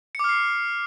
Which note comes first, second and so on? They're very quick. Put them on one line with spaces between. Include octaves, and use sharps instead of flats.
C#7 D6 F6 C7